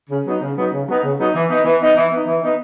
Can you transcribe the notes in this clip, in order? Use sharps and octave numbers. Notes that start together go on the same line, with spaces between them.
C#3
F#3 B3 D#4
C#3
F#3 B3 D#4
C#3
F#3 B3 D#4
C#3
F#3 B3 D#4
E3
B3 D#4
E3
B3 D#4
E3
B3 D#4
E3
B3 D#4